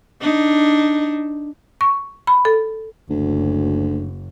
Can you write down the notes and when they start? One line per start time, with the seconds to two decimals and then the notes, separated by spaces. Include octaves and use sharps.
0.21 D4 D#4
1.81 C#6
2.27 B5
2.45 A4
3.10 F#1 D2